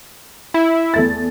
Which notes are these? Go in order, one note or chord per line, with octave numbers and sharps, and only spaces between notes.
E4
E2 A3 A6